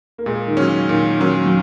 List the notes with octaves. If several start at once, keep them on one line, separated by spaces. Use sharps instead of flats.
A#3
A#2 G#3
D#3
C#3 F#3 C#4
A#2 D#3
D#3 F#3 C#4
F#3